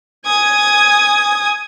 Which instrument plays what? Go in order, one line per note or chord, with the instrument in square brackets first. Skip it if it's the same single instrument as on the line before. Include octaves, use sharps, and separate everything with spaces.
[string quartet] G#5 D#6 G#6